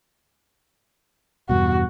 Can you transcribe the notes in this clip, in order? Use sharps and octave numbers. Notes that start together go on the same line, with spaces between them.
E2 G2 B2 F#4